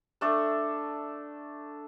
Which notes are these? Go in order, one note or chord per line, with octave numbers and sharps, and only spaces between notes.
A3 D4 A4